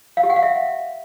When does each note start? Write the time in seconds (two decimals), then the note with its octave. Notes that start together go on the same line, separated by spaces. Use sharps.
0.17 F5
0.23 G4
0.30 F#5
0.36 F5
0.43 E5